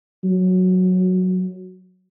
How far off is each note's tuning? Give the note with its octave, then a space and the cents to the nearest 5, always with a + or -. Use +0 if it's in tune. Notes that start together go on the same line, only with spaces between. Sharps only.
F#3 -5